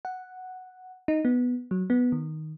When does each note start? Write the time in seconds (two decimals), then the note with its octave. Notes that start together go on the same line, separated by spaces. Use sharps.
0.05 F#5
1.08 D#4
1.25 B3
1.71 F#3
1.90 B3
2.12 D#3